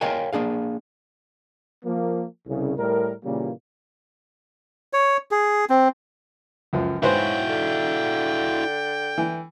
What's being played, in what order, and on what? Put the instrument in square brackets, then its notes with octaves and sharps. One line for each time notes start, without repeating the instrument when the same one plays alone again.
[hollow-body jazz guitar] A#4 C#5 D#5 F5 G5 G#5
A#3 D4 G#4 F5
[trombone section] F3 A#3
C2 C#3
A2 G3 A#4
A#2 C#3 E3 G3 A#3
[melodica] C#5
G#4
C4
[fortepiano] C#2 F#2 F3
[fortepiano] G#2 B4 C5 [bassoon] F#3 [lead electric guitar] E4 F#4 [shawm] G5
[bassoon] D3
[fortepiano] E3